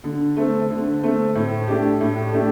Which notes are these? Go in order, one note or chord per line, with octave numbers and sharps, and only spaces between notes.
D3
A3 C4
D3
A3 C4
A2
A3 D4 G4
A2
A3 D4 G4